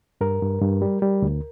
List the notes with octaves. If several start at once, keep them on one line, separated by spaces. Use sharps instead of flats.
G2 A#4
G2
G2
G3
G3
D2